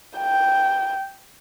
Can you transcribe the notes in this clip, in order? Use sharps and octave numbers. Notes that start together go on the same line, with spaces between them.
G5